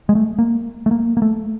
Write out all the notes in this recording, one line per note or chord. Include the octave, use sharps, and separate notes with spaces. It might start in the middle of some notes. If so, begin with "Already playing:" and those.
G#3
A3
A#3
A3
A#3
A#3
A3